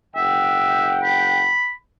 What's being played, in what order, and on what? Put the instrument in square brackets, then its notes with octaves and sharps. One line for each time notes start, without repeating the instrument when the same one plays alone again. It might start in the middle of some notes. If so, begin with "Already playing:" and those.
[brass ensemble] F#1 F#5 G5 [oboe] E5
[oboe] B5